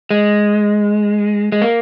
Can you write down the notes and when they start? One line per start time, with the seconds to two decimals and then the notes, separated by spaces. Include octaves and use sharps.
0.11 G#3
1.52 G#3
1.62 A#3